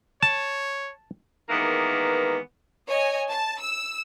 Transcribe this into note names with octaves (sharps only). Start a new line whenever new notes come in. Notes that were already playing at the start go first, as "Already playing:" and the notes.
C#5 A5
D#3 E3 G#3 A#3 B3
C#5 D#5 G#5
A5
E6